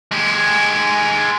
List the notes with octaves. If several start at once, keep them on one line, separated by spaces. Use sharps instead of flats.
G#3 G4